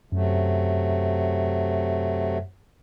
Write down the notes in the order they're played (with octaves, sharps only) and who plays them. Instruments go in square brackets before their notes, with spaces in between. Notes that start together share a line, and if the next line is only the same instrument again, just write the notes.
[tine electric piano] F#2 [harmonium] C3 F#3 A3